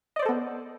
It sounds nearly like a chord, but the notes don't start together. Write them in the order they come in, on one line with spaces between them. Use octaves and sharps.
D#5 D5 C5 A4 B3